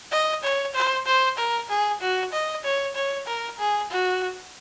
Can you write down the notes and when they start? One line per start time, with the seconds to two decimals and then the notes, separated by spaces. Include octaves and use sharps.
0.12 D#5
0.43 C#5
0.74 C5
1.06 C5
1.38 A#4
1.69 G#4
2.01 F#4
2.33 D#5
2.64 C#5
2.95 C#5
3.27 A#4
3.59 G#4
3.90 F#4